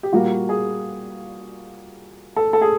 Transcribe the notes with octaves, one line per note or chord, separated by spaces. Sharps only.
G4
A#2 G3 A#3 F#4
G#4
A4
A4
G#4